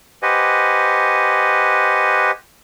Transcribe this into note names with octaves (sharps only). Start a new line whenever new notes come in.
G4 B4 C5 D#5 F#5 G#5